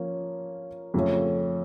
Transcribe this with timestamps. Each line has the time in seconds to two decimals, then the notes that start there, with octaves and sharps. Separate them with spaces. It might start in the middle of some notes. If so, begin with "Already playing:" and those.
Already playing: F3 A#3 C#4
0.94 F2 C#3 F3 A3 C#4